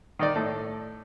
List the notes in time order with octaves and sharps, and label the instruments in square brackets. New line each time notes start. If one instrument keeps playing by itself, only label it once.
[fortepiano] D#3 D#4 D5
A2 A4